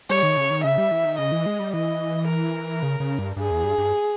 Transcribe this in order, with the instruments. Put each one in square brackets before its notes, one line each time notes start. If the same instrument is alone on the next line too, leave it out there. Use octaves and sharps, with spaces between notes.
[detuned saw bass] G3 [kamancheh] C#5
[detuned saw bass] D#3
C#3
D#3
[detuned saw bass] C#3 [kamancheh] E5
[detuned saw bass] G3
E3
D#3
[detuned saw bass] C#3 [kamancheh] D#5
[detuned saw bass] E3
G#3
G3
[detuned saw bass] E3 [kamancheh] D#5
[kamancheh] A#4
[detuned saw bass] C#3
C#3
G2
[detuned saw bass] G2 [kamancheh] G#4
[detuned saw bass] E2
G2
G2